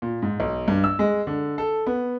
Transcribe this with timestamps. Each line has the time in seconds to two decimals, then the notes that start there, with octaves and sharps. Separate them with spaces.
0.02 A#2
0.22 G#2
0.40 B1
0.68 G2
0.84 E6
0.99 G#3
1.27 D3
1.58 A4
1.87 B3